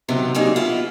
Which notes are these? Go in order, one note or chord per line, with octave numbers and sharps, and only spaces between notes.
C3 D#3 F#3 B3 C4
F#3 G3 A#3 D#4 G#4
B3 E4 F4